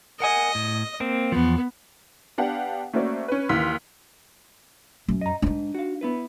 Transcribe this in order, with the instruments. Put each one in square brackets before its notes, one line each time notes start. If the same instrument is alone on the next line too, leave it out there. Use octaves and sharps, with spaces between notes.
[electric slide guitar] A#4 F#5 G#5 [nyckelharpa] D#5
[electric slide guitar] A2
A#3 C4
[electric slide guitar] E2 F3 [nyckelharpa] B3
[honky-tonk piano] B3 D4 G4 F5 F#5 A5
A3 A#3 C#4 F#4 C5 D5
C#4 B4
D#2 E3 C6 F6 B6
[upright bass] F#2
[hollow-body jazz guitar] D#5 A#5
[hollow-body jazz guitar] G#2 [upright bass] D4 D#4
[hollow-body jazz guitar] F#4 F5
B3 E4 B4